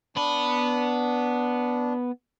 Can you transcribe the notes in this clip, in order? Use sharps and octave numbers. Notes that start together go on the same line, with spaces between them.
B3 D4 B5